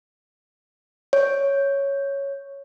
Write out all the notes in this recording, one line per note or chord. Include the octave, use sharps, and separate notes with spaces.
C#5